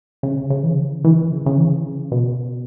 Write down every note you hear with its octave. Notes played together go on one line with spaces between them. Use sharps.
C#3
C#3
E3
C#3
E3
C#3
C#3
E3
C#3
B2